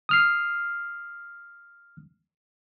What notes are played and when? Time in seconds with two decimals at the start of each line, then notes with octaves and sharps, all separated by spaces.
0.09 D#6 F6 C7